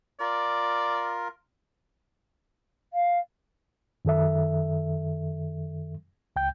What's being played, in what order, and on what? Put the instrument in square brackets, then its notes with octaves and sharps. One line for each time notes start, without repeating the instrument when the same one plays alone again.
[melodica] F4 A#4 [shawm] D5
[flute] F5
[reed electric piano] F#2 D#3 A4 E5
C#2 G5 G6